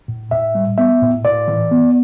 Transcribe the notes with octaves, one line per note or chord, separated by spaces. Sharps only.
A2
A2 E5
G3
B3 E5
A2
A2 D5
E3
B3